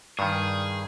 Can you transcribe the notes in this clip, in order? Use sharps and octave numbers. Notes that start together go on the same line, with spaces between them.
G2 D#3 G#4